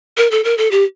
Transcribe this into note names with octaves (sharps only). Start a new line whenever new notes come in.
A#4
A4
A#4
A4
G4